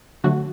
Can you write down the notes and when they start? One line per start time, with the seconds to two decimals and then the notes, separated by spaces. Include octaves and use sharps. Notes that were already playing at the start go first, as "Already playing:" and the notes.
0.24 D3 F#3 A3 F#4